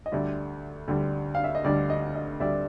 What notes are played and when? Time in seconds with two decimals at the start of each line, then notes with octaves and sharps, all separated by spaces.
0.06 D#5
0.11 D2 D3 G3 D5 E5
0.88 D2 D3 G3
1.35 F5
1.44 E5
1.55 D#5
1.64 D2 D3 G3 D5
1.90 D#5
2.15 D#5
2.40 D2 D3 G3 D5 E5